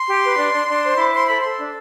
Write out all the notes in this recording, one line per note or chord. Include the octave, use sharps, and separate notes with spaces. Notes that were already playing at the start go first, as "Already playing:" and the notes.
Already playing: C6
G4
B4
D4
D4
D4
C5
E4 D6
C5 C6
A4 B5
A4 C6
D4